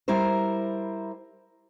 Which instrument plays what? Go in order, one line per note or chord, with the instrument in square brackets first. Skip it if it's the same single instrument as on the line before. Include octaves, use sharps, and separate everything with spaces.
[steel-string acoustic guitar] G3 E4 A#4 C5